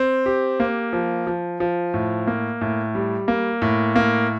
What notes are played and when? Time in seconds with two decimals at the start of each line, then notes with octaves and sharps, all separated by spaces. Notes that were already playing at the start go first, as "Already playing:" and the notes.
Already playing: C4
0.26 G4
0.60 A#3
0.93 F3
1.27 F3
1.60 F3
1.94 A2
2.27 A#3
2.61 A2
2.95 G3
3.28 A#3
3.62 A2
3.96 A#3